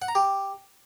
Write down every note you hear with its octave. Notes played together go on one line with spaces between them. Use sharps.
F#5
A#5
G4